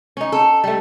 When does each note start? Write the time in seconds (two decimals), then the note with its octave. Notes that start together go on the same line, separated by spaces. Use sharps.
0.17 C#4 D#4
0.32 A4
0.64 G3 A3